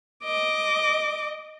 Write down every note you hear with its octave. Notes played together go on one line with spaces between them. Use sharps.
D#5 D6